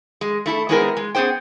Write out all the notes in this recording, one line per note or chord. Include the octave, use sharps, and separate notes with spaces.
G#3
A3 E4 A4
G#3 B3 C4 E4 G#4 A#4
G#3
B3 C#4 G#4 C5 G5